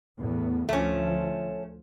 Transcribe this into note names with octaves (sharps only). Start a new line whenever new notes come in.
E2 A2 B3
D2 F3 A3 C#4